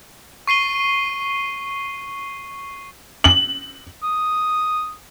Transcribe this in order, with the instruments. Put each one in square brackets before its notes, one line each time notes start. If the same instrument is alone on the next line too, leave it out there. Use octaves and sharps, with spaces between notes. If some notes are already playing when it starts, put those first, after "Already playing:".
[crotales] C#6 C7 D#7 G7
[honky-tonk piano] F#7
[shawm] D#6